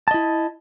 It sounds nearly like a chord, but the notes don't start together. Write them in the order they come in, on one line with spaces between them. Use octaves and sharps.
A5 D#5 E4